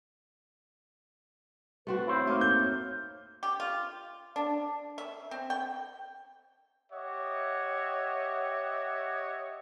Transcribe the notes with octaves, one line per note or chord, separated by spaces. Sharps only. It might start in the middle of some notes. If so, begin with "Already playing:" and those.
A3 C4 F#4 B4
E4 C5 C#5
A3 A#3 D#4
G6
G4
F4
D4
E5
C4
G5
G4 C#5 D#5 E5 F#5